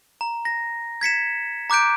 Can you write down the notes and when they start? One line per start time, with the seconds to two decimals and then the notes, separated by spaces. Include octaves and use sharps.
0.21 A#5
0.45 A#6
1.01 G#6 B6 C#7 E7
1.70 A#5 D6 F#6 G6 D7